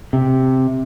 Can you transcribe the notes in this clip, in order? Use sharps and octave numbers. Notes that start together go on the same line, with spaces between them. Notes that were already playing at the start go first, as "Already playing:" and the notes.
C3